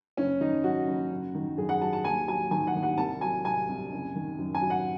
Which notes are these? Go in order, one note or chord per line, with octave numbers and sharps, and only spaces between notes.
F#1 C#4
D#3 D#4
F#2 F#4
F#1
F#1
D#3
F#2 G#4
F#5
F#3 A5
A5
D#2 G#5
F#3 G#5
D#3 G#5
F#5
D#2
F#5
C2 A5
F#3 G#5
C3 G#5
C2
F#1
D#3
F#2
G#5
F#3
F#5